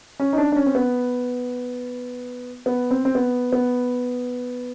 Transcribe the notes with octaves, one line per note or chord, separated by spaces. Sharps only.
C#4
D#4
D4
D4
C#4
C4
B3
B3
C4
C4
B3
B3